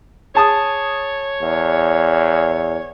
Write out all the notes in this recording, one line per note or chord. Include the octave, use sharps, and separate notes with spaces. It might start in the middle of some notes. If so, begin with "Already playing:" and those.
G#4 C#5 A5 D#6
E2